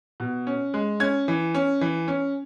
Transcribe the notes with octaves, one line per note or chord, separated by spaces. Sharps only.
B2
C#4
G#3
C#4 G#6
E3
C#4
E3
C#4